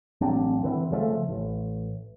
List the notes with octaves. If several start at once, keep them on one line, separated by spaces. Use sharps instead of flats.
A1 F#3 C4 D4
D3 E3 A3 C4
C#3 F3 G#3 A3
A1